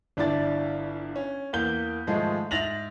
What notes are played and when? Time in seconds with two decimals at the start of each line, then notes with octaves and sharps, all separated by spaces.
0.17 G1 D4 E4 D5 A6
1.16 C#4
1.53 E2 A#3 G6 G7
2.07 G#2 D#3 F3 G#3 A3
2.51 G#2 E5 A6 A#6 F7 F#7